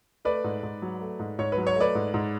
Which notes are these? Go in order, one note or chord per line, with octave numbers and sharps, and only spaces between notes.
A3 B4 D5
G#2
G#2
F#3
A3
G#2
G#2 C#5
B4
F#3
C#5
A3 B4 D5
G#2
G#2